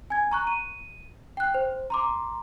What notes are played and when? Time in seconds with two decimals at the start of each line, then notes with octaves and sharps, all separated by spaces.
0.10 G#5 G#6
0.31 A#5 C#6 F#6
0.47 D#7
1.37 G5 F#6
1.54 C5
1.90 A#5 C6 D6